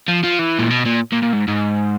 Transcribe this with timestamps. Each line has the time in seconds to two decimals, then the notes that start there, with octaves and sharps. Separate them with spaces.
0.08 F3
0.24 F3
0.39 E3
0.59 A#2
0.70 B2
0.85 A#2
1.12 A#2
1.22 A#2
1.33 G#2
1.48 G#2